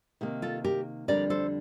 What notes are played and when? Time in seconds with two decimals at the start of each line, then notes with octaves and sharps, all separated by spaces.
0.21 C3 D#3 A#3
0.42 F4 A4
0.64 G4 A#4
1.08 F2 D3 G3 D4 A#4 D5
1.30 A4 C5